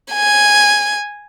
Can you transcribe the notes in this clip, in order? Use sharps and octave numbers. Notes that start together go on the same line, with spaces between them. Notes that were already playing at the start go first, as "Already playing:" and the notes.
G#5